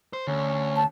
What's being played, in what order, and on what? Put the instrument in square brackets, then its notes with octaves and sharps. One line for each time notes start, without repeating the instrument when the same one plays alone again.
[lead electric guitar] C5
[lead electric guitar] D2 [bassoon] C#4
[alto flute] A5